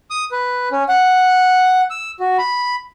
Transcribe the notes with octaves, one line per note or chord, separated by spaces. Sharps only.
D#6
B4
C#4
F#5
E6
F#4
B5